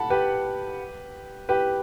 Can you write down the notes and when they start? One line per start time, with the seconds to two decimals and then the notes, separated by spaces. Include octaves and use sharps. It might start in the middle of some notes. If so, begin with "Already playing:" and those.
Already playing: F#5 A5 B5
0.10 G4 B4
1.49 G4 B4